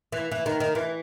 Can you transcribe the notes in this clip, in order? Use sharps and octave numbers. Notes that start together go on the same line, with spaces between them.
E3
E3
D#3
D#3
E3